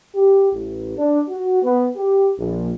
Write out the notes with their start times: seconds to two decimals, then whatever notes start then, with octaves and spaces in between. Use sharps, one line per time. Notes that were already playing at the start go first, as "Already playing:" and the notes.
0.15 G4
0.52 A1
0.97 D4
1.29 F#4
1.63 B3
1.96 G4
2.38 A#1